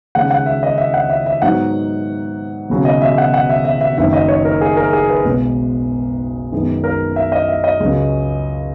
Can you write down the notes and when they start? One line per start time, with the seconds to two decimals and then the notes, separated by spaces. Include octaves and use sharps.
0.15 D#2 C#3 G#3 F#5
0.31 F#5
0.46 E5
0.63 D#5
0.78 E5
0.94 F#5
1.10 E5
1.26 E5
1.42 G#2 F#3 B3 D#4 F#5
2.70 E1 D#2 C#3 F#3
2.85 D#5
3.01 E5
3.18 F#5
3.34 F#5
3.49 E5
3.65 E5
3.81 E5
3.98 F#1 F#2 D#3 E5
4.13 D#5
4.28 C#5
4.45 A#4
4.61 G#4
4.77 A#4
4.93 G#4
5.09 B4
5.25 B1 B2 G#3
6.52 F#2 D#3 G#3 B3
6.84 A#4
7.16 E5
7.32 D#5
7.48 E5
7.64 D#5
7.80 C#2 C#3 F#3 C#4